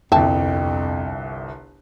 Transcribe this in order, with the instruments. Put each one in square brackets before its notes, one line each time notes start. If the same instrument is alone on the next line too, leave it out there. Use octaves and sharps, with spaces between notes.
[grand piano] G1 C2 [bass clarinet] F2 [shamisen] E5 A5 [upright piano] G5